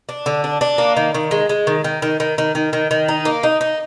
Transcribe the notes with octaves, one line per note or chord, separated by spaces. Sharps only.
D4
D3
D4
D4
A#3
D#3
D#3
G#3
G#3
D#3
D#3
D#3
D#3
D#3
D#3
D#3
D#3
D#4
A#3
D#4
D#4